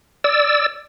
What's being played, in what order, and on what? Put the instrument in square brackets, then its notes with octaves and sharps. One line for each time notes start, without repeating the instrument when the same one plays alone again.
[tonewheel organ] D5 E6